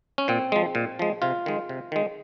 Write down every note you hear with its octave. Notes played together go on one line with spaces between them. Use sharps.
C#4
A#2 C4
F3 G#3
A#2
F3 G#3
C3 F4
D#3 G#3
C3
D#3 G#3